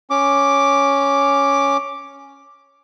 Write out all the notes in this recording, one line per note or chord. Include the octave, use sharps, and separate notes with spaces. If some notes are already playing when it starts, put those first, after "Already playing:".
C#4 D6